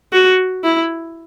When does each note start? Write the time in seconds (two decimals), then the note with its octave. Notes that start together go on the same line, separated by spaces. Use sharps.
0.13 F#4
0.64 E4